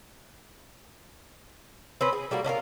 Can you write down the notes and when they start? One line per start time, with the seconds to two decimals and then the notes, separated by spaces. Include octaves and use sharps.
2.01 C4 C#4 B4
2.13 G#4
2.31 G3 A3 A#3 F#4
2.44 C#4 D4 F4 A#4